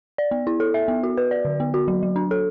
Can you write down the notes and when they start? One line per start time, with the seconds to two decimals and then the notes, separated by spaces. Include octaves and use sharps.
0.18 D5
0.31 B3
0.47 E4
0.60 A4
0.74 E5
0.88 B3
1.03 F#4
1.17 B4
1.31 D5
1.45 D3
1.60 B3
1.74 F#4
1.88 F#3
2.03 F#3
2.16 D4
2.31 A4